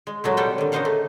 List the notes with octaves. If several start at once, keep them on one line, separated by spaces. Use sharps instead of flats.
G#3
A#2 F#3 G#3 A3
C3 G3 A4 F#5 G5
D3 D#3
C#3 A#3 D#4 C5 F5 F#5
A3